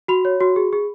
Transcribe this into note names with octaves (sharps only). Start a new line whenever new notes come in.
F#4 B5
C#5
F#4
G#4
G#4